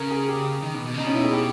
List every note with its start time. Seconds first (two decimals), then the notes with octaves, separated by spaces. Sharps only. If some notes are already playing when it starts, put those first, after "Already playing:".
Already playing: C#3 A#4
0.11 G#4
0.28 G4
0.63 D#3
0.74 B2
0.86 B2
0.94 C#3 D#4
1.03 B2 C#4
1.15 E4
1.23 G#4
1.32 G4